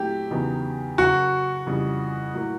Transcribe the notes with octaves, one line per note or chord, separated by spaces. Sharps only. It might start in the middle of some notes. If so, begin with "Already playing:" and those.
Already playing: A#2 F#3 A3 C4 E4 G4
E2 C#3 F#3 B3 D#4
C#3 F#3 A#3 F#4
F2 C#3 E3 G3
A2 F#3 A#3